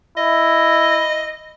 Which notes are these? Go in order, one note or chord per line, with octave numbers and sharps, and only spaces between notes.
E4 D#5